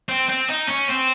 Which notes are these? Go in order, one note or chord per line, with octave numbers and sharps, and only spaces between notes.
C4
C4
D#4
C#4
C4